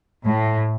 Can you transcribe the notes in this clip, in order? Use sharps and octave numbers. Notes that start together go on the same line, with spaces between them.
A2